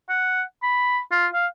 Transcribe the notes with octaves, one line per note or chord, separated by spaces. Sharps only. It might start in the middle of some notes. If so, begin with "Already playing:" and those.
F#5
B5
F4
F5